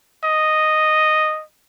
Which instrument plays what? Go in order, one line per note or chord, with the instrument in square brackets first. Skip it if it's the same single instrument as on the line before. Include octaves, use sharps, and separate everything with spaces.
[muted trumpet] D#5